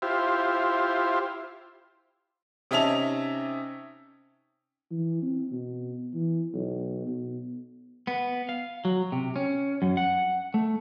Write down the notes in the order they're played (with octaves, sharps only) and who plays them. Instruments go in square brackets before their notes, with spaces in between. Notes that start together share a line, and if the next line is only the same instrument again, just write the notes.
[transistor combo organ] E4 F4 G4 C5
[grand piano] C3 C#4 D#4 E5 A5 F7
[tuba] E3
C4
B2
E3
B1
B2
[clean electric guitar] B3
F5
F#3
C3
C#4
F#2
F#5
A3